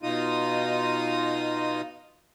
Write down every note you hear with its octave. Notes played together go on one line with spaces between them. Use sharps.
B2 D#4 F4 D#6